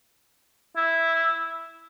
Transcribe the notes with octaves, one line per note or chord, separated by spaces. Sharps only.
E4